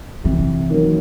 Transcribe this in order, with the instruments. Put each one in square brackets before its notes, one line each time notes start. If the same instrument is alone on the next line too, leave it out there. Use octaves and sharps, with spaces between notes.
[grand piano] C3 [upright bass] E3
[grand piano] D#3 F#3 A#3